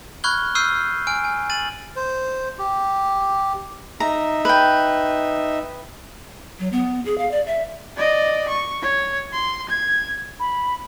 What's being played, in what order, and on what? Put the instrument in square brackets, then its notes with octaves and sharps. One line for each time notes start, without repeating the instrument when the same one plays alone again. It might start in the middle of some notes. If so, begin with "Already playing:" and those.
[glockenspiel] B5 C#6 F6 F#6 G#6 G7
C#6 E6 F6 G6 C7 D#7
G#5 F6 D7
G#5
A6 D#7 F#7
[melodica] C5
G4
[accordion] D#4 E5 [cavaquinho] A#5
[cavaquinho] B4 G5
[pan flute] F#3
B3
G#4
F5
D5
E5
[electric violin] D5 D#5
C#6
C#5
C6
G#6
[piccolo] B5